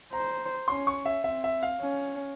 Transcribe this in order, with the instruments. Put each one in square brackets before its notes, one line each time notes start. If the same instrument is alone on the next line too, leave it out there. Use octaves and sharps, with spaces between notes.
[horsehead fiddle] C5 [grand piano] A#5
[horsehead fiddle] C#4 [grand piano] C6
[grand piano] C#6
E5
[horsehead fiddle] C4 [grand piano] E5
[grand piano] E5
F5
[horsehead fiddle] C#4